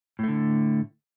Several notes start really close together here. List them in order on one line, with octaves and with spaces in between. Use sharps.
A2 A3 D3